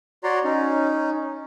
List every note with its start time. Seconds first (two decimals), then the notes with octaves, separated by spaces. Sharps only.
0.24 F#4 C#5 D5 A#5 C6
0.44 C#4 D#4